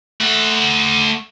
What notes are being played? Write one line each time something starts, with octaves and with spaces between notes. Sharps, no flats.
A3 F#5